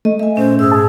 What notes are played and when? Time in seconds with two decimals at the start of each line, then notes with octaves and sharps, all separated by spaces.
0.05 A3 D#5
0.19 E5 G#5
0.37 A#2 C#4 C5
0.59 G#2 G#4 E6
0.72 A5